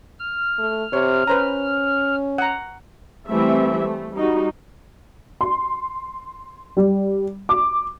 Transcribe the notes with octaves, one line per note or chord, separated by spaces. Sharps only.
F6
A3
C3 C#5
C#4 B4 C5 A#5
F#5 A#5
E3 G3 A3 C4 E5
A3
G3 D#4 F#4
C6
G3
D6